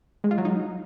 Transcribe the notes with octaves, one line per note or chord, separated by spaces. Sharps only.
G#3
F4
F#3
D#4